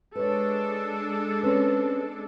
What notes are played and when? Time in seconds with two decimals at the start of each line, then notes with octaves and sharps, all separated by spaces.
0.15 G#3 D4 A4 B4 C#5
1.43 C4 C#4 B4